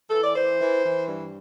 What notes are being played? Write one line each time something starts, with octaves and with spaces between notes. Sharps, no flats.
E3 A4
D5
E3 C5
E3
E3
G2